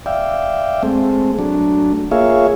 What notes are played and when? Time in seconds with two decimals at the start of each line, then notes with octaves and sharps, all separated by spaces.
0.06 D5 E5 F5 G5
0.83 G#3 A3 C4
1.39 F#3 A3 D4
2.11 A#3 F4 G#4 C#5 E5 F5